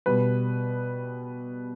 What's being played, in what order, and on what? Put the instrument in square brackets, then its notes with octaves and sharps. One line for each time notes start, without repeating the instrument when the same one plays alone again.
[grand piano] B2 G3 B4